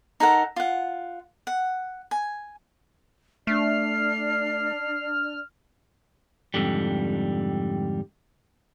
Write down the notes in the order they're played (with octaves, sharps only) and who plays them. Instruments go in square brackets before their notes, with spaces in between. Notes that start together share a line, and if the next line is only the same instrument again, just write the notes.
[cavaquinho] D#4 A4 A#4 F#5
F4 F#5
F#5
G#5
[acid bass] A3 [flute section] D4 D5 [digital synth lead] F6 [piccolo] C7
[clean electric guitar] F2 G#2 D3 G3